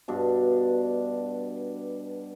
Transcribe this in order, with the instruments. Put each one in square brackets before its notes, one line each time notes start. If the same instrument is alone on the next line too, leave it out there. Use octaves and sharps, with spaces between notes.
[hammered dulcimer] G2 B2 D4